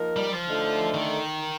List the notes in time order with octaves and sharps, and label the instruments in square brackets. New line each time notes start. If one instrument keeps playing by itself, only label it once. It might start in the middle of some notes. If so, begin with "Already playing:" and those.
Already playing: [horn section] F3 A#3 D#4 A#4
[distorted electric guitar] G3
F3
[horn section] D3 A3 D#4 A4 D5
[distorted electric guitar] D#3